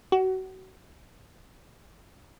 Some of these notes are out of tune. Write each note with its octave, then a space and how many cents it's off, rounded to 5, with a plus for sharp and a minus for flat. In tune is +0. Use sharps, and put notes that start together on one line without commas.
F#4 +30